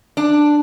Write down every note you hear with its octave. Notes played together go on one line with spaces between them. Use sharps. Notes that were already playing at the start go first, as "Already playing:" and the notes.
D4